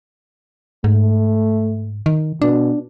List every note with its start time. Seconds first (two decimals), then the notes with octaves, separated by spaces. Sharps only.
0.84 G#2 A3
2.06 D#3
2.42 B2 D4